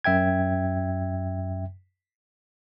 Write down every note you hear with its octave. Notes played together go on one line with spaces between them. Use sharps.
F#2 E5 G5 G#6